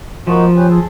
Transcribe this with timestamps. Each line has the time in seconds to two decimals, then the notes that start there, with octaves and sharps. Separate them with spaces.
0.27 F3 A#3 D#4 F#4
0.56 C#4 G4 B4
0.69 G#4 A4